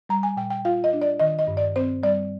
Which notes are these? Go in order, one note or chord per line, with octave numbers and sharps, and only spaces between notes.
G3 A#5
G#5
A#2 G5
G5
F4 F5
D#5
D4
D5
D#3 D#5
D#5
G2
D5
C4 C5
G3 D5